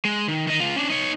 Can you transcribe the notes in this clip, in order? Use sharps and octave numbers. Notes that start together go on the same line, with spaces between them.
G#3
D#3
D#3 D#5
C#2 F4
C#4 D4
D#4 C#5